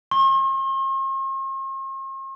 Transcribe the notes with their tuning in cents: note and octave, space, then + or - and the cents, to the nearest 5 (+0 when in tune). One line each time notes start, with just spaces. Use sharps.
C6 +45